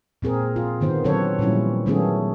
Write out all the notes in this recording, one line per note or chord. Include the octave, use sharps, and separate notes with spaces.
A#2 C4 G#4 A#4
F4
D3 D#3 B3 C5
D3 F#3 C4 A4 B4 C#5
A#2 D#3 F3 G3 C#4 E4
D#3 F#3 A3 B3 C#4 G#4